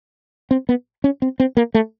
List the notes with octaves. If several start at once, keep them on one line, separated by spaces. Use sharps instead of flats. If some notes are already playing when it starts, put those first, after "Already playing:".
C4
B3
C#4
C4
C4
A#3
A3